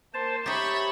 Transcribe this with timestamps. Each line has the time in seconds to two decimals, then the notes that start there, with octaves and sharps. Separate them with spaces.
0.14 A#3 C5 A5
0.46 D#4 G4 C#5 E5 B5 A6